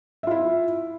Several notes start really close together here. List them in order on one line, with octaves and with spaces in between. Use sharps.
E5 F4 E4